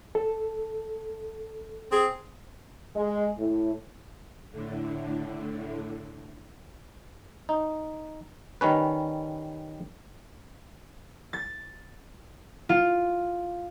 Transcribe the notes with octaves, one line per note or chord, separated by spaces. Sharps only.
A4
C4 G#4
G#3
A2
A2 D3
D#4
D#3 G3 C#4 B4
A6
F4